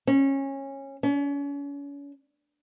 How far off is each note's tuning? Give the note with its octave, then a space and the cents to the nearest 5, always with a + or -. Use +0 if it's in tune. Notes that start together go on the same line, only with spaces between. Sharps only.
C#4 -20
C#4 +35